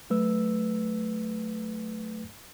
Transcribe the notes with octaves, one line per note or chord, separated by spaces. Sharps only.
F#3 A3 B4 E6